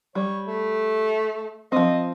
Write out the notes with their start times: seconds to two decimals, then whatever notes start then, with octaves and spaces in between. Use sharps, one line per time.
0.15 G3 C#5
0.47 A3
1.72 F3 C4 D#5